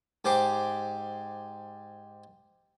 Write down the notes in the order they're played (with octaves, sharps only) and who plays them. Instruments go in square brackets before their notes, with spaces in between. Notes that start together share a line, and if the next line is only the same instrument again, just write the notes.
[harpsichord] G#2 G4 C5 D6